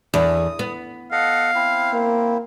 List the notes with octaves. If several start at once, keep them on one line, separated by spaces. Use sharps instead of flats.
E2 D#6
B3
A4 D#5 F5 F#5
C4 E4
A#3